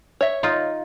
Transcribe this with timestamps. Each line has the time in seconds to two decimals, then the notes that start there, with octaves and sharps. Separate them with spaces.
0.21 C#5 E5
0.43 D#4 F4